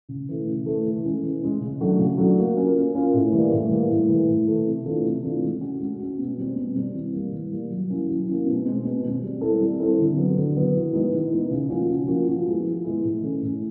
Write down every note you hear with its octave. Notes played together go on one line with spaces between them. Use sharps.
C#3
E3 A3
C#3
E3 A3
E3
G#3 C#4
E3
G#3 C#4
C#3
F#3 A3 D4 F#4
C#3
F#3 A3 D4 F#4
A#3
C#4 F4 A#4
A#3
C#4 F4 A#4
A2
E3 G3 A#3
A2
E3 G3 A#3
A2
E3 A3
A2
E3 A3
C3
E3 A3 D4 F4
C3
E3 A3 D4 F4
G#3
C#4 F#4
G#3
C#4 F#4
B2
G3 C4
B2
G3 C4
E3
G3 A#3
E3
G3 A#3
F#3
A#3 C#4 E4
F#3
A#3 C#4 E4
B2
G#3 C4
B2
G#3 C4
G3
C4 E4 A4
G3
C4 E4 A4
D3
F#3 B3
D3
F#3 B3
E3
G#3 B3 D#4
E3
G#3 B3 D#4
C#3
F3 A#3 C#4 F#4
C#3
F3 A#3 C#4 F#4
F3
G#3 B3 E4 G#4
F3
G#3 B3 E4 G#4
A2
E3 A3 C#4
A2